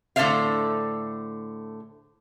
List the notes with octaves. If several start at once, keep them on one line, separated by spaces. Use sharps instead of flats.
A2 D3 A4 C5 E5 F5